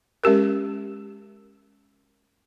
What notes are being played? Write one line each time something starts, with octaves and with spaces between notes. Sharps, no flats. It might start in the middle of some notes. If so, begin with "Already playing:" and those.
G#3 C#4 G4 A#4